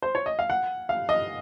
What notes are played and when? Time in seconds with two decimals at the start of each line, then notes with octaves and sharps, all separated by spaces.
0.02 C5
0.15 C#5
0.26 D#5
0.39 F5
0.50 F#5
0.89 F5
1.09 D#5